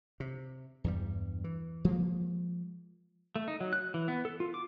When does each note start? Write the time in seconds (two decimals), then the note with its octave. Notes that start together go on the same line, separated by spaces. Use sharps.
0.20 C3
0.84 E2 G2 G3
1.44 E3
1.85 F3 G#3 A#3
3.36 A3
3.48 D#4
3.61 F#3
3.73 F#6
3.94 E3
4.08 B3
4.25 A4
4.40 F4
4.54 D6